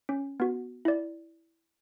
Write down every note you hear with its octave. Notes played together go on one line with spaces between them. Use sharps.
C#4
B3 F#4
E4 D5